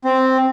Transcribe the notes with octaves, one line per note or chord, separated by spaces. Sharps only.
C4